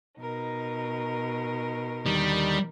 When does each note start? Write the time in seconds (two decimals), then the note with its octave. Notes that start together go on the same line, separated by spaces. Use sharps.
0.19 B2 D#4 A#4
2.06 D#2 D3 D#3 G3